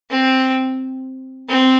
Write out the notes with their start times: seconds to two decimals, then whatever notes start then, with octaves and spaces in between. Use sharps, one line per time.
0.10 C4
1.49 C4